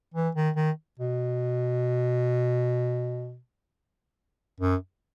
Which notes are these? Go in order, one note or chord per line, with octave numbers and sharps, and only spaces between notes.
E3
D#3
D#3
B2
F#2